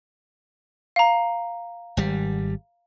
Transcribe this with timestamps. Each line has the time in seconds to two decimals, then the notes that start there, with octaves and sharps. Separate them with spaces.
0.96 F5 A#5
1.97 G#1 G3